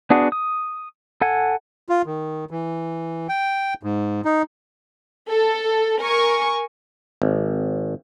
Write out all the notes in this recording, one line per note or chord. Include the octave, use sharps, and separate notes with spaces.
B3 D4 F#4 G#4
D#6
A4 F#5 G#5
F4
D#3
E3
G5
G#2
D#4
A4
A#4 G#5 C#6
G#1